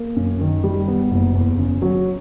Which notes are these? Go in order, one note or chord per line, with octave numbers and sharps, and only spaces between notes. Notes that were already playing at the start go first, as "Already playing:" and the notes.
Already playing: A#3
F#2
D#3
G3
B3
F#1
E2
C#3
F#3